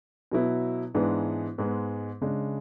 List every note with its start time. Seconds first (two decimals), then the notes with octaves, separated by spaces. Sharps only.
0.32 B2 F#3 B3 E4
0.94 G#2 E3 G#3 B3 D4
1.58 G#2 G#3 B3
2.22 C#3 G#3 D4